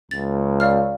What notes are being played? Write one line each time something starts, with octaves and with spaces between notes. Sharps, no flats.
C#2 A6
D5 F5 F6